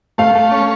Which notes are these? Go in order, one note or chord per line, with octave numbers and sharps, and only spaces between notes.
A3 F5
A3
C#4